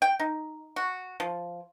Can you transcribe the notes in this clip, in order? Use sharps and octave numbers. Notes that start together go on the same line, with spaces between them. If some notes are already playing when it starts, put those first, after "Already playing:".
G5
D#4
F#4
F3